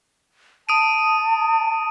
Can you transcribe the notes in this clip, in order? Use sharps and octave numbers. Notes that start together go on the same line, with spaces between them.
A5 D#6 D7 D#7